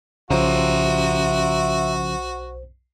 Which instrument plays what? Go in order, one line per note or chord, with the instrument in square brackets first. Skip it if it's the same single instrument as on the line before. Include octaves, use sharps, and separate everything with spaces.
[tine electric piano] B1 C5 [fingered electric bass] C#3 F3 [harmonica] F#4 [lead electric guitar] E5 A#5